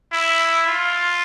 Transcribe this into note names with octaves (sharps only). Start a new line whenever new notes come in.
E4
F4